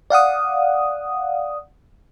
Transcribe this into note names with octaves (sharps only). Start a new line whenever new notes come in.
D5 F5 F#5 D#6